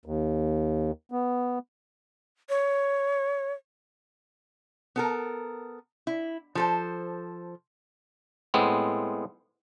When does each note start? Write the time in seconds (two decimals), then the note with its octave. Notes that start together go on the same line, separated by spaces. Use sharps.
0.06 D#2
1.12 B3
2.49 C#5
4.96 B3 A4 A#4
6.07 E4
6.55 F3 A4 C5
8.54 A2 G#3 B3 C4